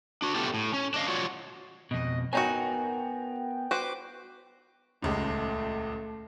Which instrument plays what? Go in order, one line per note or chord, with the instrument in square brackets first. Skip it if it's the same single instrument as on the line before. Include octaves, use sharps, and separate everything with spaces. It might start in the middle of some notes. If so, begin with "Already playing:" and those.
[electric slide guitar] D4 F#4
A3 B3 D4 F4 G4 A4
A2
C#4
D4 D#5 F5
F4 F#4 C#5 D5 F#5
[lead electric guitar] F2 B2 [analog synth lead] D#5
[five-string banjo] F#3 D#4 F#4 [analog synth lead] B3 [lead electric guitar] A#4 G#5 [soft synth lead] G5
[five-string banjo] F#4 B4 C5 [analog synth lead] D6
[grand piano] D#1 C#2 G#3 [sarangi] A3